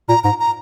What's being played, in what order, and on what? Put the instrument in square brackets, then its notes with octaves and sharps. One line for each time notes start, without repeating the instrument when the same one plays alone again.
[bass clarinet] A#2 [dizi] A#5
[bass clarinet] G#2 [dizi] A#5
[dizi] A#5